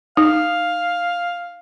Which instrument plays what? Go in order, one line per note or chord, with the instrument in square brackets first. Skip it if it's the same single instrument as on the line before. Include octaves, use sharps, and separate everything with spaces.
[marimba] D#4 [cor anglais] F5